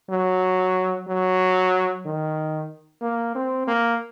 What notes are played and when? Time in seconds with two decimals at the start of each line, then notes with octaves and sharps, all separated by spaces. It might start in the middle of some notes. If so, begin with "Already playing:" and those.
0.10 F#3
1.08 F#3
2.05 D#3
3.02 A#3
3.35 C4
3.67 A#3